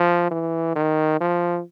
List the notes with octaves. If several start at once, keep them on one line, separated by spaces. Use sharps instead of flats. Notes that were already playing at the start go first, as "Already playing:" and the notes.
Already playing: F3
E3
D#3
F3